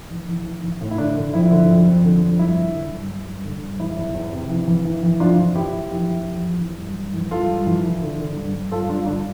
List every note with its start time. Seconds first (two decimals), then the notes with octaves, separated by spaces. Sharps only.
0.10 E3
0.28 E3
0.46 E3
0.63 E3
0.81 A2
0.91 E4
0.98 D3 D4
1.16 D3
1.34 F2 E4
1.51 D3
1.69 F2
1.86 F2
2.04 D3
2.22 F2
2.39 G2 E4
2.57 D3
2.75 D3
2.92 G2
3.09 G2
3.27 G2
3.45 D3
3.62 G2
3.80 E2 E4
3.97 E2
4.15 E2
4.33 C3
4.50 E3
4.68 E3
4.85 E3
5.03 E3
5.20 F2 D4 F4
5.38 E3
5.55 E3 E4 G4
5.73 E3
5.90 F2 E4 G4
6.09 E3
6.26 F2
6.44 F2
6.61 E3
6.78 G2
6.96 G2
7.14 E3
7.31 G2 F4 A4
7.49 G2
7.66 E3
7.84 E3
8.02 D3
8.19 D3
8.37 G2
8.54 G2
8.71 G2 F4 A4
8.89 G2 D4 F4
9.06 D3 D4 F4